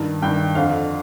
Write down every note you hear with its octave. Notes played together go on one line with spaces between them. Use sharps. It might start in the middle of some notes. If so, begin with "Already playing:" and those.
Already playing: G2 D#3
G2 D#3 G5
F2 D3 F5